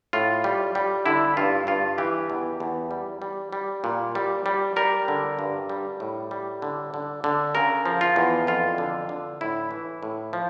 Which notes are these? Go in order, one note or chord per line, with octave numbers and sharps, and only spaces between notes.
A2 F4
G3
G3
D3 E4
G2 F4
G2 F4
E3 G4
E2
E2
G3
G3
G3
A#2
G3
G3
G3 A#4
D3
G2
G3
A2
G3
D3
D3
D3
C#3 A#4
F3
F4
E2
F2 F4
D3
D3
A2 E4
E3
A2
F3